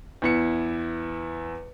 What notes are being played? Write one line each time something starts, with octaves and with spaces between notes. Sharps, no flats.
E2 E4 C#7